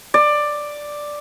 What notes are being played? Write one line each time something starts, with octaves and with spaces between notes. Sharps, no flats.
D5